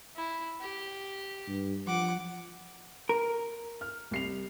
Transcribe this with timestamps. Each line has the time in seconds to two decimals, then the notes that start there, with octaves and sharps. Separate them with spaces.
0.16 E4
0.61 G4
1.48 G2
1.87 F3 F#5 D6
3.09 A#4
3.81 F6
4.11 C2 C7 F7